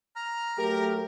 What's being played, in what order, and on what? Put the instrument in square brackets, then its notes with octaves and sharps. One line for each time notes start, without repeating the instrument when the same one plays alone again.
[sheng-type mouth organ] A#5 F6
[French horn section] F#3 A3 [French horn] G4 [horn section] A#4